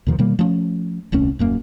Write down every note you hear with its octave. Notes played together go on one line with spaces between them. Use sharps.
D#2 B2 D#3 F3
B2 D#3 G3 A#3
F3 A3 C4 C#4
D#1 C2 A3 C#4
D#1 F#2 A#3